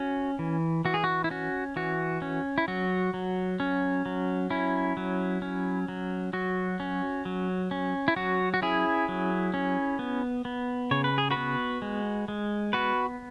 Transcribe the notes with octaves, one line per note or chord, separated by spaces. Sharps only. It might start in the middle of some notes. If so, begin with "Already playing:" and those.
Already playing: C#4 F#4
E3
E3 F#4
G#4
F#4
E4
C#4 F#4
E3 F#4
C#4
E4
F#3 F#4
F#3
C#4
F#3
C#4 E4
F#3
C#4
F#3
F#3 F#4
C#4
F#3
C#4
E4
F#3 F#4
F#4
C#4 E4 G#4
F#3
C#4
B3
B3
C#3 C#5
B4
G#4
F#4 B4
B3
G#3
G#3
B3 F#4 B4